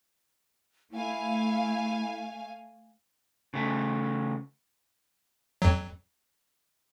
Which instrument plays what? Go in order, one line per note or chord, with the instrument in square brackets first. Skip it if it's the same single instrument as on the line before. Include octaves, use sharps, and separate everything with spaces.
[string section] A3 F5 G#5 [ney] E4
[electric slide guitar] C#3 A3
[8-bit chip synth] F2 F#3